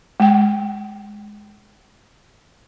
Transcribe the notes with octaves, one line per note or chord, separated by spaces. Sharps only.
G#3 G5